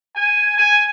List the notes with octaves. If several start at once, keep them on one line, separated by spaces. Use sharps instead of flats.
G#5
G#5